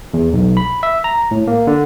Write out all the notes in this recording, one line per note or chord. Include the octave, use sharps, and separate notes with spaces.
E2
B1
B5
E5
A#5
A2
A#3
D3